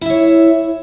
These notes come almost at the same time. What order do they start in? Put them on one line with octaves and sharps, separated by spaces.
E4 E5 C#5